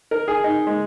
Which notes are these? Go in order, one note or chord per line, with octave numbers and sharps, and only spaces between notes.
A#4
G#4
D#4
G#3